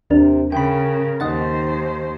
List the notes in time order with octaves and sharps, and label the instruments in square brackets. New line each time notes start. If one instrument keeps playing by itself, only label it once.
[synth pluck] D#2 D4 A#4 [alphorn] C3
[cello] C#3 [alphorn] A#4 [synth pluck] G5 B5
[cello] D#2 C5 [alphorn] D#3 [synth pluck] D#5 F#5 A6